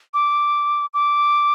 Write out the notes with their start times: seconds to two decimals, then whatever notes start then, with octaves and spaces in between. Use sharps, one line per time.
0.14 D6
0.94 D6